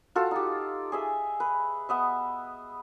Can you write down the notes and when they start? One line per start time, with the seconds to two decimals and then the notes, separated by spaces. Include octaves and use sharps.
0.15 F4 F#4 A4 F5
0.31 D#4 G4
0.92 G#4 D#5 E5
1.40 B4
1.89 B3 D#5 E5